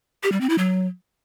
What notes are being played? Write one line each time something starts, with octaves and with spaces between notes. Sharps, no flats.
G4
G3
C4
E4
F#3